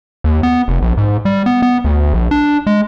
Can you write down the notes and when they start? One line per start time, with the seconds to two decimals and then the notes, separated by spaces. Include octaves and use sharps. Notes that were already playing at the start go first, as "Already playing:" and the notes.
0.24 D#2
0.43 B3
0.68 F1
0.82 A#1
0.97 G#2
1.25 G3
1.46 B3
1.62 B3
1.84 D2
2.14 A#1
2.31 D4
2.67 G#3